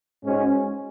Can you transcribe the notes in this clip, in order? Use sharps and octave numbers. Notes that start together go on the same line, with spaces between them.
G#2 G#3 C#4 F#4